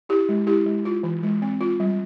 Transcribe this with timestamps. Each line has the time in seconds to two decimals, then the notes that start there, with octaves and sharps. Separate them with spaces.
0.09 E4 G4
0.29 G#3
0.47 E4 G4
0.66 G#3
0.85 F4
1.03 E3
1.23 G#3
1.42 C4
1.61 F4
1.80 G3